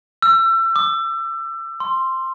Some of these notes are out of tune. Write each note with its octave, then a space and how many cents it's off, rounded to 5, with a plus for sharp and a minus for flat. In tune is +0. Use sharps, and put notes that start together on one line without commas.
E6 +30
D6 +35
C6 +5